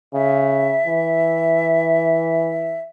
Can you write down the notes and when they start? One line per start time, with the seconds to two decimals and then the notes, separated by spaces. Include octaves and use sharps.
0.14 C#3 E5
0.87 E3